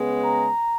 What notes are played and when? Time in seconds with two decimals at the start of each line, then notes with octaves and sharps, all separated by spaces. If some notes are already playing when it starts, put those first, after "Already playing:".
Already playing: C#3 G#3 B3
0.25 A#5